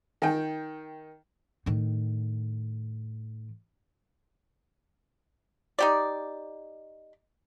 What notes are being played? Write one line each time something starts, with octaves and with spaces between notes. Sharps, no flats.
D#3 G5
A2 D#3
D#4 G4 D5